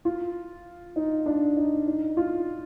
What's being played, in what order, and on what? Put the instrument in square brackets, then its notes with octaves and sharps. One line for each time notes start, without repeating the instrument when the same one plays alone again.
[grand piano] F4
D#4
D4
D#4
D#4
F4